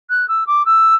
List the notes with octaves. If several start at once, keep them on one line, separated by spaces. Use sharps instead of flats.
F#6
E6
D6
E6